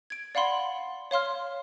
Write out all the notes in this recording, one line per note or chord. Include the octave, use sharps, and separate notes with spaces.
G#6 D7
D5 F5 F#5 B5 C6
C#5 F5 C6 F6